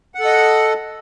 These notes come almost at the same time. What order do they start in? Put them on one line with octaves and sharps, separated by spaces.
F#5 A4 D#5